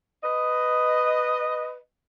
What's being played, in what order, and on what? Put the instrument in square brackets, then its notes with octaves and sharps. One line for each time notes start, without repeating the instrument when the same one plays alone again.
[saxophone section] B4 D#5